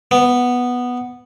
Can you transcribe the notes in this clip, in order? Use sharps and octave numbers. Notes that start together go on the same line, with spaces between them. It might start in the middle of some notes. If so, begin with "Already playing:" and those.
B3